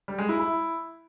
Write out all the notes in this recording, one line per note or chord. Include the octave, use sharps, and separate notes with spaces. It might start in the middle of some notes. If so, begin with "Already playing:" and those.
G3
G#3
E4
E4